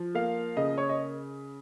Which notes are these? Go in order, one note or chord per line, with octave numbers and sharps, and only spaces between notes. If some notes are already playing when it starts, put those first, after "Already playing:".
Already playing: F3
A#3 F5
C#3 D#5
C#5
D#5